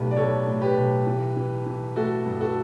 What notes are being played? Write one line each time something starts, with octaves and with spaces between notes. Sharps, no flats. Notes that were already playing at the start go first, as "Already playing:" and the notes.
Already playing: B1 A2 G3 G4 B4
D5
B1 A4 C#5
A2
G4 B4
B1
E3
E3
E3
A3 F#4 A4
G2
F#4 A4